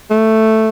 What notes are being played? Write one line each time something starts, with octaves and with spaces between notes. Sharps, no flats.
A3